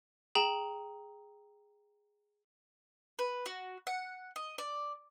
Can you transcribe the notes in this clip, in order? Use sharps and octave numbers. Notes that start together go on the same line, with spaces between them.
G#4 G5 A#5 E7 F#7
B4
F#4
F#5
D#5
D5